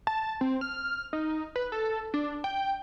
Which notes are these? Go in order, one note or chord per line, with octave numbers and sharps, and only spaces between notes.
A5
C4
F6
D#4
B4
A4
D4
G5